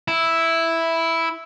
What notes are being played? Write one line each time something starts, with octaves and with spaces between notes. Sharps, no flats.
E4